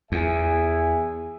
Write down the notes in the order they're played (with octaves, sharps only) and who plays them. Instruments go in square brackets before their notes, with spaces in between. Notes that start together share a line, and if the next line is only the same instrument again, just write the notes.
[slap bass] E2 [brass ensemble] G#4 E5 G#5